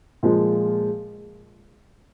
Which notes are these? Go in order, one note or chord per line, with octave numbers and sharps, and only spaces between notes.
A#2 F3 G#3